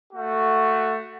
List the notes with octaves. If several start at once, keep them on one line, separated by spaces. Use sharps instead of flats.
A3 F#4